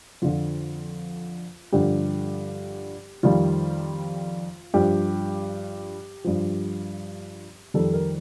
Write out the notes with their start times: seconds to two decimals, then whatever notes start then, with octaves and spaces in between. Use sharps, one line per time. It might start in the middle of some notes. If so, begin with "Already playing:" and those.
0.22 F2 D3 F3 F4
1.73 G2 D3 F3 G4
3.23 F2 D#3 G3 F4
4.74 G2 F3 G4
6.24 G2 F3
7.74 F2 D#3 G3 A4
7.94 A#4